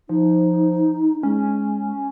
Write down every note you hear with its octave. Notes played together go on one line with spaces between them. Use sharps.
F3 D#4
G#3 C#4